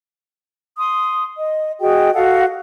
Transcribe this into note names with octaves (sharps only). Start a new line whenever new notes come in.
C6 D#6
D#5
F#4 G#4 D#5 G5
F#4 A4 F5 F#5